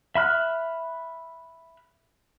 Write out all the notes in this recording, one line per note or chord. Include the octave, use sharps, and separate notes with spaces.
E5 B5 F6 F#6